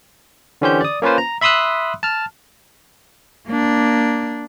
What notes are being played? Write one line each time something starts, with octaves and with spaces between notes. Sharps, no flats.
D3 E3 C#4 G4 C5 G6
D5 D#6
A#3 C#4 F4 B4 C5
A#5
E5 B5 C6 D#6 E6 F#6
A5 F6
A#3 D4